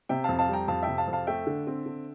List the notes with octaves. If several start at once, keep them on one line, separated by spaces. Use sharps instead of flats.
C3 E5 G5
F2 F5 A5
F5 A5
G3 G5 A#5
F2 F5 A5
C3 E5 G5
F5 A5
F2
F5 A5
A3 E5 G5
D3
C4
D3